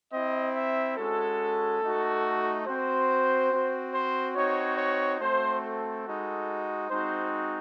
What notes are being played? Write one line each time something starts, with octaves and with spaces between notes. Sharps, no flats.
C4 E4 D#5
E5
G#3 C#4 F#4 A4
A3 D#4 F#4
C4 F#4 C5
C4 F#4
C5
C4 D#4 F#4 C#5
C#5
A3 C4 F#4 C5
A4
G#3 D#4 F#4
G#3 C4 D#4 F#4 C5